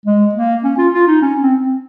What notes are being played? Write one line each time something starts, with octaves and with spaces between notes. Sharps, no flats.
G#3
A#3
C#4
F4
F4
D#4
C#4
C4
C4